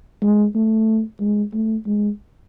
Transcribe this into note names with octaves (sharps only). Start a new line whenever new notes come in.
G#3
A3
G#3
A3
G#3